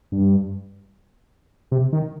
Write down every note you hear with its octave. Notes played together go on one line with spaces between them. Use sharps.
G2
C3
D#3